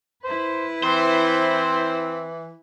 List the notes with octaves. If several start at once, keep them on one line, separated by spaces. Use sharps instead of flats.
E4 B4 C5
E3 C4 C5